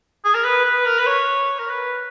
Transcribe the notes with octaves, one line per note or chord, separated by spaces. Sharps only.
G#4
A#4
B4
B4
A#4
B4
C#5
A#4
B4